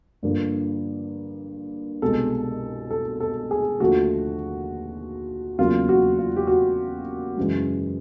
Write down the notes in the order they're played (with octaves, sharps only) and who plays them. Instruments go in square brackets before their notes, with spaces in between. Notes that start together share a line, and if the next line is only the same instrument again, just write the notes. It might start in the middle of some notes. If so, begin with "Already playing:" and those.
[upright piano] G2 D3 F3 A#3
C2 B2 G#3 A4
A4
A4
G#4
D#2 D3 F3 A3 F#4
E2 C#3 F#3 A#3 F4
F#4
F4
G4
F#4
F#2 C#3 E3 G#3